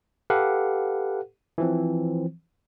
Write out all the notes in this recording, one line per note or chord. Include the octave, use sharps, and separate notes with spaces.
G4 A4 B4 F5 F#5
E3 F3 C4